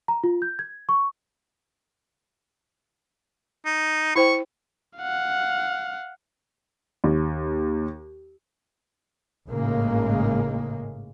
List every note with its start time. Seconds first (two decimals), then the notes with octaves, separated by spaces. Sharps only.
0.08 A#5
0.24 F4
0.42 G6
0.59 G#6
0.89 C#6
3.66 D#4
4.16 E4 C5 G5 C#6
4.97 F5 F#5
7.04 D#2
9.49 G#1 A2 C#3 G#3 A#3